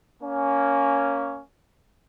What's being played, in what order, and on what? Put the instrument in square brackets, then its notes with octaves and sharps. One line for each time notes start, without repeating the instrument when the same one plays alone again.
[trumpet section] A#3 C#4